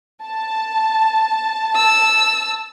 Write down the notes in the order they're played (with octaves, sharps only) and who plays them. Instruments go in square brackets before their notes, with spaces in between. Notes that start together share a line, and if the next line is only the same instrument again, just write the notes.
[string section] A5
[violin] E6